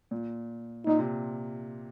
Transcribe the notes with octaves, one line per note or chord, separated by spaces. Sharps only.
A#2
A#2 D#4
C3